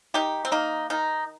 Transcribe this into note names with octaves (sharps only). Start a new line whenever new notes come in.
D#3 D#4 G4
C4
A#3 D#4
D#3 D#4